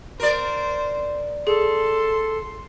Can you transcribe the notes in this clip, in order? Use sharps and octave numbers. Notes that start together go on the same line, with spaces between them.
A#4 C5 D5
G#4 A4 C6